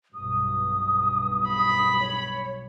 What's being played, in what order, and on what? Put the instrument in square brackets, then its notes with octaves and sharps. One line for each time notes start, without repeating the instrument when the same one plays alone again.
[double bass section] B1 G2 [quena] D#6
[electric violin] B5
[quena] C#5